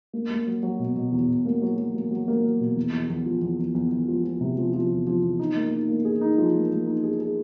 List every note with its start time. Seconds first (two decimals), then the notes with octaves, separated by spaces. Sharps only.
0.13 A#3
0.30 A#3
0.47 F#3
0.63 F#3
0.79 B2
0.96 B2
1.12 E2
1.28 B2
1.46 A#3
1.62 F#3
1.78 F#3
1.95 A#3
2.11 F#3
2.28 A#3
2.44 F#3
2.60 B2
2.76 E2
2.93 E2
3.10 E2
3.26 F3
3.42 E2
3.59 E2
3.75 E2
3.92 E2
4.08 F3
4.24 F3
4.41 C3
4.58 F3
4.74 F3
4.90 E2
5.07 F3
5.23 E2
5.39 D#4
5.56 A#3
5.72 D#4
5.89 A#3
6.05 G#4
6.21 D#4
6.38 F3
6.54 A#3
6.71 A#3
6.87 D#4
7.04 G#4
7.20 G#4